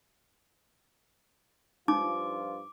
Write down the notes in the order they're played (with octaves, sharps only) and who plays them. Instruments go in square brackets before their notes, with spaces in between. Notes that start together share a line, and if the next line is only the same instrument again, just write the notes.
[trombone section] G2 F3 F4 [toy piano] D#4 [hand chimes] D6